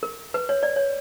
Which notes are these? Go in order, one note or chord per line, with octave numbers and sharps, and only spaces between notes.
A#4
B4
C#5
D5
C#5